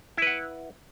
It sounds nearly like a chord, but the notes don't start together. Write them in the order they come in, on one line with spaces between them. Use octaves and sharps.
E4 B4 F#5